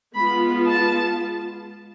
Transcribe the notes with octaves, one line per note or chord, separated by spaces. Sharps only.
G#3 B3 F4 B5
A5